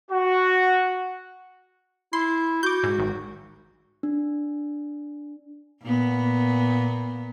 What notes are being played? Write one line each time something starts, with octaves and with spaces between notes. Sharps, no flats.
F#4
E4 C6
F#4 D6 G6
G#2
G#1
D4
A#2 B3